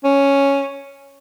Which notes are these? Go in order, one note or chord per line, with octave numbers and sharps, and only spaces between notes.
C#4